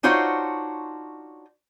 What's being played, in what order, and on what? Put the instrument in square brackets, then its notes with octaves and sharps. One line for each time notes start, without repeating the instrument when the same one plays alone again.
[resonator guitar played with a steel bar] D4 D#4 F4 F#4 C5 C#5